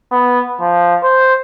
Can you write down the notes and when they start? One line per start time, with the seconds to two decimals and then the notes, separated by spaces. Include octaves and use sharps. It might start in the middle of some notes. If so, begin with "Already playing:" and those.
0.11 B3
0.60 F3
1.03 C5